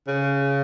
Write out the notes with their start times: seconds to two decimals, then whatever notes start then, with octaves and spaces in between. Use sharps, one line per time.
0.08 C#3